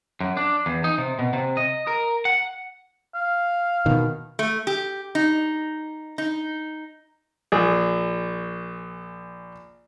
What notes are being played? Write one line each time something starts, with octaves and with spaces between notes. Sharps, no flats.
F#2
D4
E2
D#4
C3
B2
C3
D#5
A#4
F#5
F5
B2 D#3
A3
G4
D#4
D#4
A#1 G#4